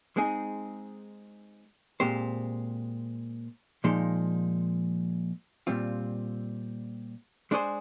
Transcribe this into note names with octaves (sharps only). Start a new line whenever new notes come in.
G#3 C4 D#4 G#4
A#2 G#3 C4 G4 C5
A#2 F3 G#3 D#4
A#2 G3 C4 F4
G#3 D4 G#4 C5